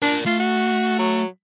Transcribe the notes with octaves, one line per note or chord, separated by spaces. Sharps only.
D4 A#4 D5
A3 F4
F#4
F#3